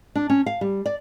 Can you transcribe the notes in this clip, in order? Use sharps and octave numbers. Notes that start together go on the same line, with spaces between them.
D4
C#4
F5
G3
D5